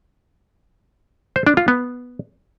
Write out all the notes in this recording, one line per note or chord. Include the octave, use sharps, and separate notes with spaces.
C5
D4
F4
B3